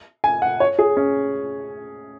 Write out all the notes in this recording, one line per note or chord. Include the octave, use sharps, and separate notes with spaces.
G#5
F#5
C#5
G#4
C#4